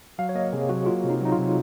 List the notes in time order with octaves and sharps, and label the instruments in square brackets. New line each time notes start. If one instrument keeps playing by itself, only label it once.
[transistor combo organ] F#3 [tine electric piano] F5
[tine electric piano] C#5
[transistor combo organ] A#3 [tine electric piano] D#5
[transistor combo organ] C3 [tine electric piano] G#4
[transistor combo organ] F#3 [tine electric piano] F#4
[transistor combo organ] A#3 [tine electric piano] F4
[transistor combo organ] C3
[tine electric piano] D#4
[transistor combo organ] F#3 [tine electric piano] D#4
[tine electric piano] F4
[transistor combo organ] C3